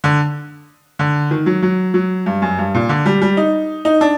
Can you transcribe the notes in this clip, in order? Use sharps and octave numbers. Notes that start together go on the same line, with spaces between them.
D3
D3
D#3
F#3
F#3
F#3
G2
F#2
G2
A#2
D3
G3
G3
D#4
D#4
D4